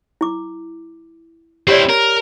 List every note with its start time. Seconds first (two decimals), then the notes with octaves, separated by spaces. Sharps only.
0.21 E4 D6
1.68 C4 E4 G4 C#5 D5
1.90 A#4